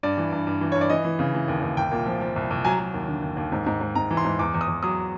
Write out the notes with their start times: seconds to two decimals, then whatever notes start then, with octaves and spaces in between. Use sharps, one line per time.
0.03 G2 D5
0.17 E3
0.32 G2
0.47 G2
0.61 E3
0.72 G2 C#5
0.81 D5
0.90 E3 D#5
1.05 E3
1.19 C#3
1.34 E3
1.48 D#2
1.62 D#2
1.77 C2 G5
1.92 A#2
2.06 F3
2.21 F3
2.36 C2
2.50 C2
2.65 F#3 G#5
2.79 F#3
2.94 D#2
3.08 D3
3.22 D#2
3.37 D#2
3.52 G#2
3.66 G#2
3.81 G#2
3.95 G#2 A#5
4.11 E3
4.17 C6
4.25 G#2
4.39 E2 D6
4.54 E2
4.61 D#6
4.68 E2
4.83 F#3 D#6